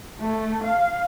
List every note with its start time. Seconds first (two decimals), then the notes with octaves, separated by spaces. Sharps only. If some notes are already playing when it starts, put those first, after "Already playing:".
0.19 A3
0.65 F5